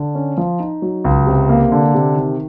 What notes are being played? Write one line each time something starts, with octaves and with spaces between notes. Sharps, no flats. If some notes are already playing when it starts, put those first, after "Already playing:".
Already playing: D3
C#4
F3
D#4
F#3
C#2
C3
A#3
D3
C3
D#3